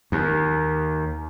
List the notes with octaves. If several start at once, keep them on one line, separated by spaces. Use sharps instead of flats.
D#2